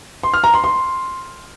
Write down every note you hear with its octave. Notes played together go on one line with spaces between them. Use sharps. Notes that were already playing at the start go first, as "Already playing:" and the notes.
C6
F6
A#5
C6
C6